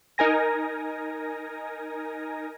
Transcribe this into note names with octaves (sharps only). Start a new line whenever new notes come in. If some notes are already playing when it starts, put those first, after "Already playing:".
D#4 A#4 G#5 A#6